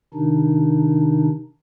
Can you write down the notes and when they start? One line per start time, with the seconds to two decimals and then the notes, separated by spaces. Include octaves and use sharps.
0.14 C3 D#3 D4 D#4